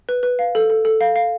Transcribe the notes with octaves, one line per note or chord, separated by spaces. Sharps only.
B4
B4
F5
A4
A4
A4
F5
F5